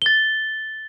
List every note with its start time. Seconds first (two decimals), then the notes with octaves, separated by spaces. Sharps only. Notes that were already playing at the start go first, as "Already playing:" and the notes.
0.02 A6 G7